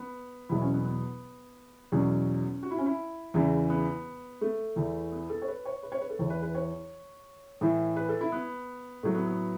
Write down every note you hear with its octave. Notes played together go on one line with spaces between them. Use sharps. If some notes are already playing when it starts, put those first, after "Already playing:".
Already playing: B3
E2 B2 F#3 E4
C#4
B3
B3
E2 B2 F#3 C#4
F#4
E4
C#4
E4
E2 C#3 E3
B3
A3
E2 E3
B3
A4
C#5
B4
C#5
B4
C#5
B4
A4
E2 E3 C#5
B4
B4
C#5
A2 E3
B4
A4
E4
B3
A2 F#3 A3
B3
B3